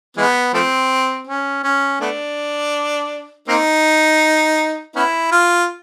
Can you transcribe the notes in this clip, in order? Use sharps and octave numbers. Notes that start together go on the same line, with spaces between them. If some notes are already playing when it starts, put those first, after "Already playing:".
E3 G#3 B3
F3 A3 C4
C#4
C#4
A3 B3 D4
A#3 C4 D#4
B3 C#4 E4
F4